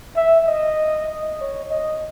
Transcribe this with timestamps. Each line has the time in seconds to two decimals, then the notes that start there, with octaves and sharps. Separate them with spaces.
0.16 E5
0.47 D#5
1.41 C#5
1.70 D#5